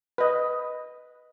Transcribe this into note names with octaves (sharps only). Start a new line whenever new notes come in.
B4 D#5